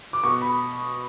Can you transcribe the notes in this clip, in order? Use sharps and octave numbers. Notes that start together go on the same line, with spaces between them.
D6
B2 C#6
B5